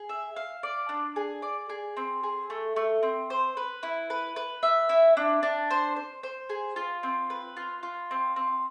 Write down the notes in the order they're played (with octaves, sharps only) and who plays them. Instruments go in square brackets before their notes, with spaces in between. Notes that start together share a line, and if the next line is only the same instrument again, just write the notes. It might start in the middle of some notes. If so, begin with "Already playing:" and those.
Already playing: [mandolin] G#4
E5
F5
D5
D4
G#4
D5
G#4
C4
G#4
A3
A3
C4
C5
B4
E4
B4
B4
E5
E4
D4
D4
C5
C5
C5
G#4
F4
C4
B4
F4
F4
C4
C4